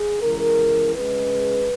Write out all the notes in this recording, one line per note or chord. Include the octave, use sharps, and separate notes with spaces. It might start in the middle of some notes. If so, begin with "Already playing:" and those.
Already playing: G#4
C#3 E3 G#3 A#4
C#3 G#3 B4